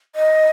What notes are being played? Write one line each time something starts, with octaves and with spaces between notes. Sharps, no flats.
D#5